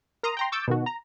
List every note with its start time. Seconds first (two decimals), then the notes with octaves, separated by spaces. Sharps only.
0.23 A#4 A#5 C6 D#6
0.37 G5 A#5 C6
0.52 C#6 D6 E6 G6 A6
0.68 B2 D#3 F#4
0.86 A#5